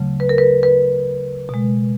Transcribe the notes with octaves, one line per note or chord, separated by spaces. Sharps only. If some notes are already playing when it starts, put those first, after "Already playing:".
Already playing: D2 C#3 F#3 A3
B4
A#4
B4
B4
B2 G#3